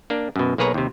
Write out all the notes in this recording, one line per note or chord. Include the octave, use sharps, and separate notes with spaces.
A#3 D4
F#2 B2
B1 A#3 G#4 B4 C#5 A#5
D#2 C3